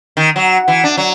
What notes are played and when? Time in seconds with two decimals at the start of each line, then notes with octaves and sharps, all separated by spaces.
0.17 D#3
0.36 F#3
0.68 E3
0.84 D4
0.97 F#3